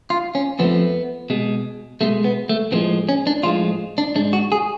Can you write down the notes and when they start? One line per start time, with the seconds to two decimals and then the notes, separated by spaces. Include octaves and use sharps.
0.10 F4
0.35 C#4
0.59 F2 F3 A3 B3
1.30 B2 G#3
2.01 B2 G#3 A3
2.24 B3
2.49 A3
2.72 A2 F3 G#3 B3
3.09 C#4
3.27 D4
3.43 A2 F3 G#3 F4
3.98 D4
4.15 G#2 G#3 D4
4.33 F#4
4.52 G#4